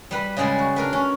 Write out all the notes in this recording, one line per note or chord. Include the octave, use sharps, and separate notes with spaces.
G3 B4 B5
C#3 G3 G#3 D5 G#5
F#4
D4 A#4 B4
C#4